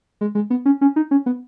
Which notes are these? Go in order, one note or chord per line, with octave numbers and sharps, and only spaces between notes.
G#3
G#3
B3
C#4
C#4
D#4
C#4
B3